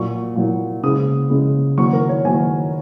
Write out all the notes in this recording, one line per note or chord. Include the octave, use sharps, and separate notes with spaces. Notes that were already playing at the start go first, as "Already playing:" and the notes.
Already playing: A#2 F#3 A#3 C#6
A#2 F#3 A#3
C#3 G#3 D#6
C#3 G#3
D#3 F#3 A#3 C#6
A#4
C#5
D#3 F#3 A#3 G#5